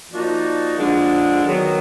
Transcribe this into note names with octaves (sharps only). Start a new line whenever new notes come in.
F3 A#3 D#4 F#4 D5
D3 F3 G#3 D4
D#3 F#3 B3